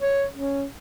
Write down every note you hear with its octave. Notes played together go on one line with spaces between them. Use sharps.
C#5
C#4